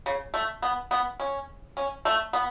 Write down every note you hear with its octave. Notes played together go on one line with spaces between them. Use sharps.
C#3
A3
B3
B3
C#4
C#4
A3
B3